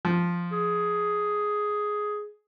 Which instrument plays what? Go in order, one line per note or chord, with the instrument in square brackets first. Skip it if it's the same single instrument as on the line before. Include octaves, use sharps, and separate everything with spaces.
[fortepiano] F3
[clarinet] G#4